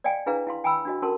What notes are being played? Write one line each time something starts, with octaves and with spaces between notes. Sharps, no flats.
D5 D#5 F5 G5 G#5
D4 E4 G#4 B4 F5 A#5
E4 F5 C6
G5 G#5 A#5 B5 E6
D4 F#4 D#5
C#4 F#4 A4 A#4 A5 C6